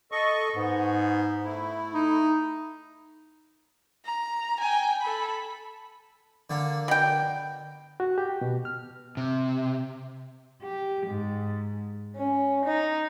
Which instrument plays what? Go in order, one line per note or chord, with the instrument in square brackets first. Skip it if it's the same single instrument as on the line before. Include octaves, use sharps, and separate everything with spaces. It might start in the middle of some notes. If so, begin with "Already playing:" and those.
[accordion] A4 D#5 C#6
[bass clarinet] G#2 [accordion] B3
[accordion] A3 E4
[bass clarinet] D#4
[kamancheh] A#5
G5 G#5
A4 B5
[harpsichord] D3 A#3
[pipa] B2 G5
[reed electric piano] F#4
G4
B2
F6
[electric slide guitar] C3
[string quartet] G4
G#2
C#4
D#4